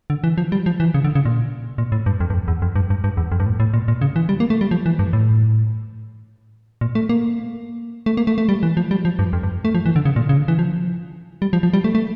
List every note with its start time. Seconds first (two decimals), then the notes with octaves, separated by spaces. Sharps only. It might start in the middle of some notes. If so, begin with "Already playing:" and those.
0.10 D3
0.24 E3
0.38 F3
0.52 G3
0.66 F3
0.80 E3
0.94 C#3
1.04 D3
1.15 C#3
1.25 A#2
1.78 A#2
1.92 A2
2.06 G2
2.20 F2
2.30 G2
2.34 F2
2.48 E2
2.62 F2
2.76 G2
2.90 G2
3.04 G2
3.17 E2
3.32 F2
3.40 G2
3.46 A2
3.60 A2
3.74 A#2
3.88 A#2
4.01 C#3
4.16 E3
4.29 G3
4.40 A#3
4.50 A3
4.61 G3
4.71 F3
4.86 E3
4.99 G2
5.13 A2
6.81 A#2
6.95 A3
7.09 A#3
8.06 A3
8.17 A#3
8.27 A3
8.38 A3
8.49 G3
8.63 E3
8.77 F3
8.91 G3
9.05 F3
9.19 G2
9.33 F2
9.43 G2
9.65 A3
9.75 F3
9.86 E3
9.96 D3
10.05 C#3
10.16 A#2
10.29 C#3
10.38 D3
10.48 E3
10.59 F3
11.42 G3
11.53 F3
11.63 F3
11.73 G3
11.84 A3
11.95 A3